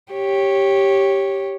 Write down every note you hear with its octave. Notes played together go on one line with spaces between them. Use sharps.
G4 C#5